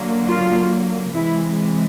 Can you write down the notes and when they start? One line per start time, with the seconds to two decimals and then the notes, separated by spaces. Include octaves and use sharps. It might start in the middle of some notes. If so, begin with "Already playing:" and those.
Already playing: D3 F#3 A#3
0.28 F4
1.15 C3 E3 G#3 E4